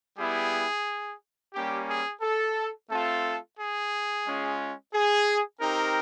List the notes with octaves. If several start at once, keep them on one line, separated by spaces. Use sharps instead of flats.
G3 B3 E4 G4 G#4
G3 A#3 C#4 G4
G#4
A4
A3 C4 F4 A4
G#4
G#3 C#4 F4
G#4
C4 D#4 G4 A#4